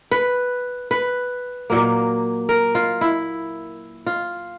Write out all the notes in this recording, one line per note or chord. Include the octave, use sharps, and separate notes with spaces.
B4
B4
A#2 F#3 A#3
A#4
F4
E4
F4